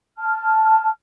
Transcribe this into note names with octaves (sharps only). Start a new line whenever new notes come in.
A5 F6